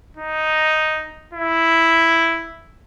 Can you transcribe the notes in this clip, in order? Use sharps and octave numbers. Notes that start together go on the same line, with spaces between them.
D#4
E4